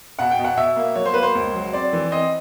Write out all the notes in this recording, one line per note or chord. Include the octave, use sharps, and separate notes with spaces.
B2 F#5
G5
B2
F#5
B2 E5
A#3
F#3 C#5
C5
A#3 B4
C5
C#2
F#3
C4 D5
E3
C4 D#5